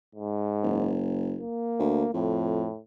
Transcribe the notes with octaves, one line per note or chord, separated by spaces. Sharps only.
G#2
F#1
A#3
D2
F2 A2